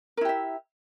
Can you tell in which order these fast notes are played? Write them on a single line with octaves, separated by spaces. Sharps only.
A#4 E4 G4 E5